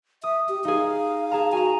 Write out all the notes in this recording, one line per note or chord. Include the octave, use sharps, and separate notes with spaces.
E5 D#6
G4
D#4 G#4 F5
G#4 A5 A#5
F#4 G#5 A#5